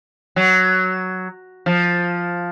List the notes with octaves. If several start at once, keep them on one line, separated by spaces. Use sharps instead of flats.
F#3
F3